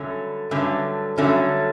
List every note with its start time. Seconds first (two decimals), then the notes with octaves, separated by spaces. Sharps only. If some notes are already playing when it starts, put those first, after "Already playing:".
Already playing: G2 D3 F#3 A3 C#4
0.51 G2 D3 F#3 A3 C#4
1.18 G2 D3 F#3 A3 C#4